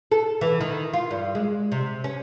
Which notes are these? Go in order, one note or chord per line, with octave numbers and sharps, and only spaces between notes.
A4
E3
D#3
F4
G2
G#3
C3
C#4